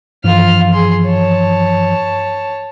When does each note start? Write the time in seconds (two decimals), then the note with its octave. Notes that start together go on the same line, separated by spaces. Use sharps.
0.24 G2 E3 F3 F4 F6
0.73 G#4 C6
1.06 C#5 A5